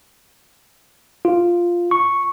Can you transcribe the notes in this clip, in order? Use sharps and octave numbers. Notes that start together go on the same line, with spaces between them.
F4
C#6